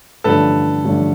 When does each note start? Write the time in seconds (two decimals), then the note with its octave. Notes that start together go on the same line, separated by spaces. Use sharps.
0.24 A1 G2 D3 F3 A4 B4
0.84 A1 G2 D3 F3